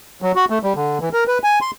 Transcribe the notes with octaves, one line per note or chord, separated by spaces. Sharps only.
F#3
F#4
A3
G3
D3
E3
A#4
B4
G#5
C6